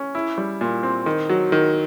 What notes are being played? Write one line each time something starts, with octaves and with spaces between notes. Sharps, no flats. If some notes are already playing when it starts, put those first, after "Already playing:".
Already playing: C#4
E4
G3
A#2
C4
D#3
F#3
D#3